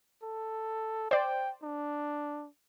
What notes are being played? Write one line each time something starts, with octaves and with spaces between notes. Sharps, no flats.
A4
C5 D5 G5
D4